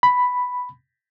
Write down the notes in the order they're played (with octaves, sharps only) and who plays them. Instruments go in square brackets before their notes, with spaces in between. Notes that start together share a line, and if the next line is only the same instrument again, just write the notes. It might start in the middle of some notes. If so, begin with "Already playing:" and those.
[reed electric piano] B5